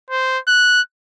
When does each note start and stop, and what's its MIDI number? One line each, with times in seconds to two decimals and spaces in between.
0.10 0.38 72
0.47 0.81 90